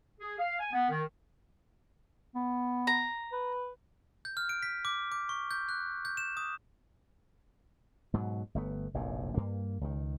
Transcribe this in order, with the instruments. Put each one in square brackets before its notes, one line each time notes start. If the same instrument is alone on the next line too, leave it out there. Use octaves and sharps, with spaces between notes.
[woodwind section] G#4
F5
G#5
B3
D#3
[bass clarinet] B3
[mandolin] A#5
[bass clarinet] B4
[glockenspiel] G6
F6
D7
B6
D6
D6
C#6
G6
F#6
G6
E7
D#6
[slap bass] G#2 B2 F#3
G1 A3 B3
F1 A#1 F#2 A2
G2 A#3
C#2 D#3